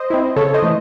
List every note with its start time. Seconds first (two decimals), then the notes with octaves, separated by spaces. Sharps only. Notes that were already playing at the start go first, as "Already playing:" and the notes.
Already playing: C5 D#5
0.10 C4 E4
0.36 C#3 A4 C#5
0.54 C5 D#5
0.62 E3 A3